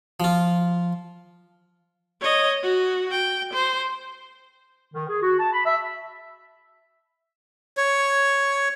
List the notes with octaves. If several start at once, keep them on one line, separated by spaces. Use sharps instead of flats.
F3 F4
C#5 D#5
F#4
G5
C5
D#3
G#4
F#4
A5
B5
E5
C#5